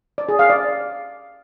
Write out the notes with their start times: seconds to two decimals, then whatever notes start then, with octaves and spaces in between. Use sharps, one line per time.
0.18 D5
0.29 G#4
0.39 F5
0.50 D5